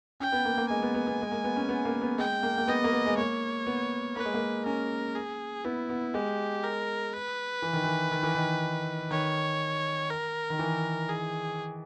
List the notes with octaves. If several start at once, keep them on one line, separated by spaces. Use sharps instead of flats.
C#4 G5
B3
A#3
A#3
G#3 G#5
B3
B3
B3
G#3
A#3
B3
C#4
B3
A#3
B3
G#3 G5
A#3
A#3
B3 D#5
A#3
B3
G#3
A#3 C#5
B3
A#3 B4
G#3
A#3
C#4 A#4
G#4
B3 E4
B3
G#3 G4
A#4
B4
E3
D#3
E3
D#3
E3
D#3
D#3 C#5
A#4
D#3
E3
G#4